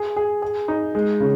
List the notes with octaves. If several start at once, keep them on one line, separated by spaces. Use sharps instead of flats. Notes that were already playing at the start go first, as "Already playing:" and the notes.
Already playing: G#4
G#4
G#4
D#4
G#3
C#3